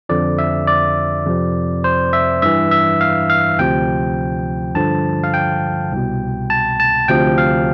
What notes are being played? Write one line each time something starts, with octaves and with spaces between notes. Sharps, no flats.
F2 D3 F3 D5
E5
D5
F2 C3 F3
C5
E5
G2 E3 E5
E5
F5
F5
D2 C3 F3 G5
G2 D3 F3 A5
F5
G5
C2 B2
A5
A5
D2 C3 F3 G5
F5